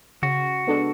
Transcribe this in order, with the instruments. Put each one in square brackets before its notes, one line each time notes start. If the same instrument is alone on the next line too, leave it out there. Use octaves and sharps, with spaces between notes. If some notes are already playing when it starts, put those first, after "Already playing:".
[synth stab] C#3 [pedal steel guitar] F#4
[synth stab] G#3 B3 D4 A4